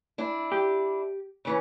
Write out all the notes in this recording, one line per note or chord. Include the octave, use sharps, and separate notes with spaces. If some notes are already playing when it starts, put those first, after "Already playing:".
D4 E4
G4
C#3 E3 C#4